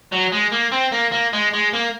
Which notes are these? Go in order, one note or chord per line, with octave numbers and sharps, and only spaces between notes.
F#3
G#3
A#3
C4
A#3
A#3
G#3
G#3
A#3